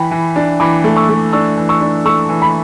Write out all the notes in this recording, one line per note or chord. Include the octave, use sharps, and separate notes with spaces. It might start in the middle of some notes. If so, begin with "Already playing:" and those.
Already playing: E3 G5 B5
E3
D4
E3 B5 D6
A3
C#6 E6
A3
D4 C#6 E6
E3
C#6 E6
D4
A3 C#6 E6
E3
B5